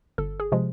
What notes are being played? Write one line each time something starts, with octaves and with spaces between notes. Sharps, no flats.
G1 A4
G#4
C3 F3 G#3